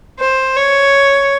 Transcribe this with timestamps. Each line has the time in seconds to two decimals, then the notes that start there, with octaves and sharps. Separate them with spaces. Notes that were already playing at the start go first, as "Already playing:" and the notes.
0.19 C5
0.57 C#5